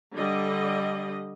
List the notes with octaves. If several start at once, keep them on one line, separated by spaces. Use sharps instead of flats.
D3 G3 D#5